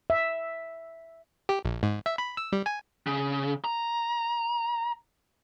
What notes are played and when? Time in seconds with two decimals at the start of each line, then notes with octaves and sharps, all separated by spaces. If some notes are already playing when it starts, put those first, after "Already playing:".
0.10 E5
1.49 G4
1.65 A#1
1.83 G#2
2.06 E5
2.18 B5
2.37 E6
2.52 G3
2.66 G#5
3.07 C#3
3.65 A#5